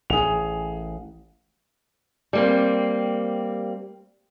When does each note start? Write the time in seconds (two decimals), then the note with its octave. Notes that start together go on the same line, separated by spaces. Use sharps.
0.10 A1 G#4 F7
2.33 G3 A#3 C4